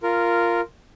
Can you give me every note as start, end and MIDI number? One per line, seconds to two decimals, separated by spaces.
0.03 0.61 65
0.03 0.61 70